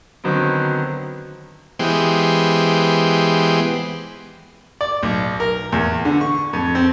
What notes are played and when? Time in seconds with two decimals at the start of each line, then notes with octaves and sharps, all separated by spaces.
0.24 D3 D#3 F#3 B3 C4
1.79 E3 G#3 B3 G4 C5
4.81 D5
5.03 B1
5.40 A#4
5.72 E2
6.05 D3
6.21 C#6
6.53 F2
6.75 C4